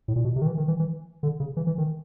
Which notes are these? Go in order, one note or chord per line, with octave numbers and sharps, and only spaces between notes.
A2
A#2
B2
C3
D#3
E3
D#3
E3
E3
D3
C#3
E3
E3
D#3